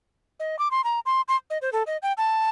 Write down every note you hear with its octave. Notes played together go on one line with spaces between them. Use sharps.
D#5
D6
C6
A#5
C6
C6
D#5
C5
A4
D#5
G5
A5